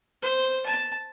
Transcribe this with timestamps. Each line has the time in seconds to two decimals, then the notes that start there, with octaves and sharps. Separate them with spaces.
0.22 C5
0.66 A5